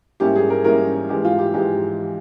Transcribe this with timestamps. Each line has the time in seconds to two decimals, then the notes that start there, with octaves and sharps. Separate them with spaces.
0.20 G#2 G3 A#3 C#4 E4 G4
0.36 G#4
0.50 A#4
0.64 G#2 G3 A#3 C#4 E4 A#4
1.09 G#2 E3 G#3 G4
1.25 F4
1.39 G4
1.53 G#2 E3 G#3 G4